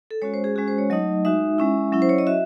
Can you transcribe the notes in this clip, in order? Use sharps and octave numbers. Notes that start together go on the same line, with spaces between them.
A4
G#3 C#4 F#4 C#5
C5
G#4
G#3 C#4 F#4 G#4
C5
C#5
F#3 A3 D#4 D#5
G#3 D#4 F#4 E5
G#3 C#4 E4
F#3 C#4 E4
C5
C#5
D#5
F#4 E5